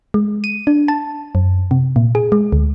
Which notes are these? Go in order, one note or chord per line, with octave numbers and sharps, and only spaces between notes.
G#3
D#7
D4
A5
F#2
C3
A#2
G#4
G#3
D2